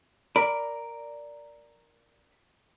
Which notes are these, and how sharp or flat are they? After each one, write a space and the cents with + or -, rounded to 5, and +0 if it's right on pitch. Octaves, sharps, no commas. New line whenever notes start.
A#4 +0 D5 +0 B5 +0